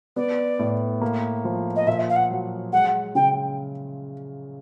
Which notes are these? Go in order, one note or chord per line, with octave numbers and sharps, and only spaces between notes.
B3 D5
A2
A#3
F3
D#5
A#2 E5
F5
F#5
F#3
G#3 F#5
C#3 G5